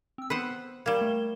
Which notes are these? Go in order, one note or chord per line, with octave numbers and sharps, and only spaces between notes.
C4 E6
B3 B4 C5 F#5 B5
G3 A#3 G#6 E7 G7
A3